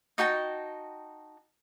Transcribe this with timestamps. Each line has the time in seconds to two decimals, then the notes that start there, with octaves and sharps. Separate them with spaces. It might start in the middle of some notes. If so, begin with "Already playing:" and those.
0.18 D#4 F#4 G5 A5